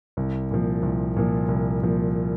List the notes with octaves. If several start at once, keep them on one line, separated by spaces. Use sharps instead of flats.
C2
A#2 F3
C2
A#2 F3
C2
A#2 F3